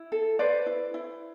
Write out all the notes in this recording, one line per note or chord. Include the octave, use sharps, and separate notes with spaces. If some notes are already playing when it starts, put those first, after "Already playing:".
Already playing: E4
A4
B4 C5 D5
E4
E4